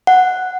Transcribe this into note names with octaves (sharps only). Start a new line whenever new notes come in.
F#5